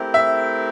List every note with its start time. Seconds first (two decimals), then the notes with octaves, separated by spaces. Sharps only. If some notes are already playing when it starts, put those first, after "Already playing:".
Already playing: A3 C4 E4 G4 A#4
0.14 E5